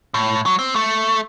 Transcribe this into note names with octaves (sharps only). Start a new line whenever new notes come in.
A2
F#3
C4
A3